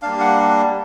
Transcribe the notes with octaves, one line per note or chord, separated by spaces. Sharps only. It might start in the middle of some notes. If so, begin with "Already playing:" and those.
G3 A#3 D4 F5
F#5